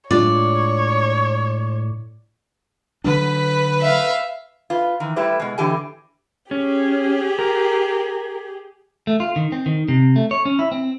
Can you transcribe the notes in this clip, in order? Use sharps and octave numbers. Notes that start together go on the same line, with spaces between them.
A2 G#3 D4 F4 C#5 D5
D3 F#3 D4 B4 B5
E5 F5
F4 B4
D#3 E3
G3 A3 E4 G4 B4 C5
B2 G#3
A2 D3 E3 G4 A4 G#5
C#4 G4 G#4
A#4
A3
F4
D#3
C4
D#3
C3
A3
C#5
C#4
E4
C4